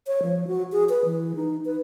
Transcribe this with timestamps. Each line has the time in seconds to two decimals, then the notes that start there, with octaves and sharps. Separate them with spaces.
0.07 C#5
0.23 F3
0.47 F#4
0.72 G#4
0.89 B4
1.05 E3
1.36 D#4
1.65 B4